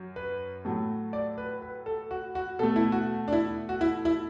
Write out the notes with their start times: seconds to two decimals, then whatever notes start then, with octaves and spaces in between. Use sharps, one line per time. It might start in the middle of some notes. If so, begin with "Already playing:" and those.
Already playing: F#2
0.16 B4
0.65 A2 F#3 A3
1.13 D5
1.38 B4
1.62 B4
1.86 A4
2.11 F#4
2.35 F#4
2.59 B2 A3 A4
2.76 E4
2.92 F#4
3.28 D4
3.33 E4
3.69 F#4
3.81 E4
4.05 E4